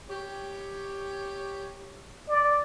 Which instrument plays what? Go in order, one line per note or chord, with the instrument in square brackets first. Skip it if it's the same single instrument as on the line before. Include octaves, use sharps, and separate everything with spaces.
[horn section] G4 C#5
[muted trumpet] D5